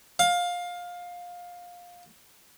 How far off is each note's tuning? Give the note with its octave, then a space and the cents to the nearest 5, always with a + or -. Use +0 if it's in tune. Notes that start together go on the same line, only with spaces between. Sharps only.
F5 +20